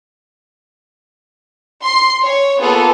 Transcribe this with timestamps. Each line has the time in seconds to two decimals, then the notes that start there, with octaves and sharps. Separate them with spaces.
1.83 C6 C7
2.24 C#5
2.60 A#3 B3 F4 G#4 A4